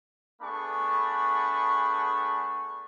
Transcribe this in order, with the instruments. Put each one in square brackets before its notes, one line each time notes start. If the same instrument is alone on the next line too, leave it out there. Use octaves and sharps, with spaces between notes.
[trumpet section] A3 B3 D4 G#4 B5 C#6